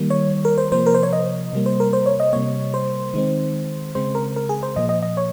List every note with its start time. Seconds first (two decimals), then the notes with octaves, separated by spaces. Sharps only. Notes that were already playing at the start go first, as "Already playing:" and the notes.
Already playing: D#3 G3 A#3
0.10 C#5
0.45 A#4
0.58 C5
0.72 C3 F3 A#3 C5
0.86 A#4
0.94 C5
1.03 C#5
1.13 D#5
1.53 C3 G3 A#3
1.66 C5
1.80 A#4
1.93 C5
2.06 C#5
2.20 D#5
2.33 C3 G3 A#3 C#5
2.74 C5
3.14 D#3 G#3 C4
3.95 C#3 G#3 C4 C5
4.15 A#4
4.36 A#4
4.49 G#4
4.63 C5
4.76 A#2 F3 A#3 D#5
4.89 D#5
5.03 D#5
5.17 C#5